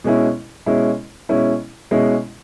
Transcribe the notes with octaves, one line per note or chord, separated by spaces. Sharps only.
B2 G#3 C#4 E4
B2 G#3 C#4 E4
B2 G#3 C#4 E4
B2 G#3 C#4 E4